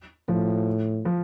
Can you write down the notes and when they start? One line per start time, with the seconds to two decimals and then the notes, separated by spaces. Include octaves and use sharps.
0.28 A2 F3
1.05 F3